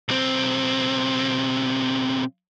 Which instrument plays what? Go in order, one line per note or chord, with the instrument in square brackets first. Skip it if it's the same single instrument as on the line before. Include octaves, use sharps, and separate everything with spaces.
[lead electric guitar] B1 C4